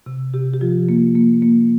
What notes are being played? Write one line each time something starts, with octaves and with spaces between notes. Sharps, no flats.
C3
C3 G4
G4
F3 F4
A#3
A#3
A#3